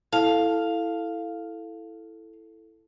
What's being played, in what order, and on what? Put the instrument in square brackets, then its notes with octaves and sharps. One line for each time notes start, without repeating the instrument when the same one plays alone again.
[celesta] E4 A4 A5 [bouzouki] F5